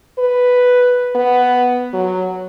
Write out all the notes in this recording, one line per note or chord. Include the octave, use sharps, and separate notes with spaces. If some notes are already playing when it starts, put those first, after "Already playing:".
B4
B3
F#3